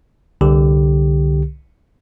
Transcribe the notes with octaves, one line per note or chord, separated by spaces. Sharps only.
C2 D3 G4